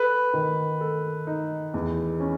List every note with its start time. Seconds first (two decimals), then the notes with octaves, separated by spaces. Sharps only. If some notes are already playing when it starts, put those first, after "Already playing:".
Already playing: A4 B4
0.34 D#3
0.81 A4
1.27 D#4
1.74 E2
2.20 C#4